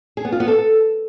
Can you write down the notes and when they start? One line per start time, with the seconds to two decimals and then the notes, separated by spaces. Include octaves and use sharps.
0.17 G#4
0.25 B3
0.32 F4
0.40 B3
0.48 A4